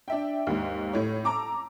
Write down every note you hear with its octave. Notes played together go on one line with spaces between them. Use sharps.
D4 E5 G5
D#2 G#2
A2 C#5
A5 A#5 D6 E6